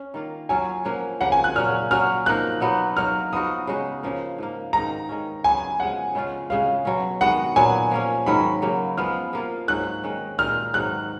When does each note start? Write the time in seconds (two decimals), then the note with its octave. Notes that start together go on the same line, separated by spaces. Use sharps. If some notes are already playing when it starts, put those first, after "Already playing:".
Already playing: C#4
0.14 D#3 A#3 F4
0.49 F#3 C#4 F4 G#5
0.85 F3 A#3 C#4 F#4
1.21 C#3 F3 A#3 F#5
1.32 G#5
1.44 F#6
1.55 A#2 F#3 C#4 F6
1.91 F#3 C#4 F#4 F6
2.26 F3 A#3 D#4 F#6
2.60 B2 F#3 B3 D#4
2.97 F#3 A#3 D#4 F#4 F6
3.32 F3 B3 D#4 F#4 D#6
3.67 C#3 G#3 D#4 F#4
4.03 C#3 F3 A#3
4.38 G#2 F3 A#3
4.73 G#2 D#3 A#3 D#4 A#5
5.09 D#3 G#3 C#4
5.44 C#3 F#3 B3 G#5
5.80 C#3 F3 G#3 F#5
6.15 C#3 G#3 C#4 F4
6.50 C#3 G#3 C#4 F5
6.85 B2 F#3 C#4
7.21 D#3 G#3 B3 F#4 F#5
7.56 A#2 F#3 B3 G#5
7.91 F3 A#3 C#4
8.26 G#2 D#3 F#3 C#4 B5
8.62 C#3 F#3 A#3
8.97 F3 G#3 B3 F6
9.33 F3 A#3 F4
9.68 G#2 F#3 C#4 F#6
10.03 D#3 G#3 C#4
10.38 A#2 G#3 D#4 F6
10.74 G#2 D#3 F#3 F#6